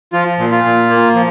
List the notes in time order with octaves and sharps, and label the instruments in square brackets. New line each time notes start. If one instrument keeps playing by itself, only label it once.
[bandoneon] F3 F4
A#2
F4
A#2
A#3
F3